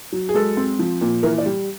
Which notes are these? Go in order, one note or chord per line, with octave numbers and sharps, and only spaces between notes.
F#3
G#4
G#3 A4
C4
F3
A#2
E3 A#4
D5
G3